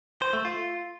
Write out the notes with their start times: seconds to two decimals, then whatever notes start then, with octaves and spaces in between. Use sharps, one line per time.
0.22 C5
0.33 A3
0.45 F4